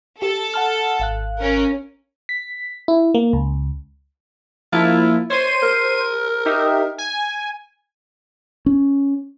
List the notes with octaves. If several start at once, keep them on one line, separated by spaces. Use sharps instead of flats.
G4 A4
F#5 A5 F6
G#1 F5 F#6
C#4 A#4
B6
E4
A#3
C#2
F3 A#3 E4 F4
C5 C#5 C6 D#7
A#4
D#4 G4 E5
G#5
C#4